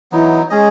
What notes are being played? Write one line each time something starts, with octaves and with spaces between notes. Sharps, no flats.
E3 F#3 B3 D#4
G#3 C#4 G#4 D#5